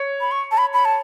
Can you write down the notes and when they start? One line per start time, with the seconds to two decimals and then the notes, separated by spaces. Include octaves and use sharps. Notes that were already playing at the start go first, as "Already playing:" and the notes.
Already playing: C#5
0.21 B5
0.31 C#6
0.52 A5
0.58 B5
0.73 B5
0.85 A5